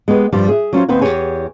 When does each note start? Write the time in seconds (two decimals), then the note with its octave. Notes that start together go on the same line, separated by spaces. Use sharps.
0.08 G#3 B3 G4 B4
0.33 G2 F3 G3
0.49 G#4 E5
0.73 F#3 C#4 F4 C5
0.89 D#2 B3 C4 B4 C5 F#5
1.01 E2 F#3 G4 G#4 C#5 G#5